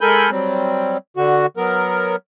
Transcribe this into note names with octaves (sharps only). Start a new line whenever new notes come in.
G#3 A4 A#4 G#5 B5 G6
F#3 G3 C4
D3 F#4
F#3 B3 A#4